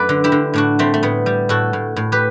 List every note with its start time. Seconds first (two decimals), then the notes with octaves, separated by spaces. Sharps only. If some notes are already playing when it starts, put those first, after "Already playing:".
Already playing: F#2 A3 B4 D5
0.09 D3
0.24 E4 G4
0.32 D3
0.54 A2 D4 F#4
0.79 G3 A3 C4
0.94 A3
1.03 A2 B3
1.26 G3
1.49 A2 F#4 A4
1.73 A2
1.96 A2
2.12 G4 B4